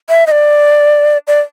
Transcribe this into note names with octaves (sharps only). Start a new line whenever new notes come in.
E5
D#5
D5
D5